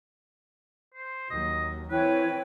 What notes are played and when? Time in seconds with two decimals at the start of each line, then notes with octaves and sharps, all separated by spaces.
0.95 C5
1.31 D#2 F#3 D#5
1.91 E3 C4 E4 B4 C#5 G5